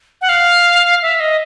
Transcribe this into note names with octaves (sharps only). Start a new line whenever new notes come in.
F#5
F5
E5
D#5